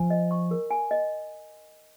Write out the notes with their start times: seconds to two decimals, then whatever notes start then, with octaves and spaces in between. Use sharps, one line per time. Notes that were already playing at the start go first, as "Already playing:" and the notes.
Already playing: F3 G#5
0.10 D#5
0.31 C#6
0.51 A#4
0.71 G#5
0.91 D#5